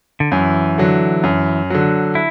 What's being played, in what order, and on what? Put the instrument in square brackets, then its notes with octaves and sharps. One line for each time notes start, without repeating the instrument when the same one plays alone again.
[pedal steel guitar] D3
[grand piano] F#2 [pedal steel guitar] E3
[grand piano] D3 F#3
F#2
D3 F#3
[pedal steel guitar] E4